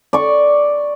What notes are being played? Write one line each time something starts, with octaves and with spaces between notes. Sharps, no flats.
D5 C#6